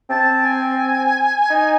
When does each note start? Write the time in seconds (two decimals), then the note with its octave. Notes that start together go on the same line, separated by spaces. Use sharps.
0.10 C4 A5
0.45 G#5
1.50 D#4